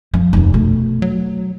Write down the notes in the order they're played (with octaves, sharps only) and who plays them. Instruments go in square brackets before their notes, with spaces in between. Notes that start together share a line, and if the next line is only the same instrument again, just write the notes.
[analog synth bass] F#2 [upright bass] F3
[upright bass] F1 D#2
[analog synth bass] B2 [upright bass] A3
[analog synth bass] F#3